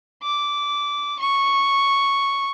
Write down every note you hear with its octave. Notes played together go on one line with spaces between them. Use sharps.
D6
C#6